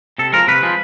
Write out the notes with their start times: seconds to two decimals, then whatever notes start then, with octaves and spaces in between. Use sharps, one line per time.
0.18 C3 A4
0.32 F3 G#3 A#4
0.47 C3 B4
0.63 F3 G#3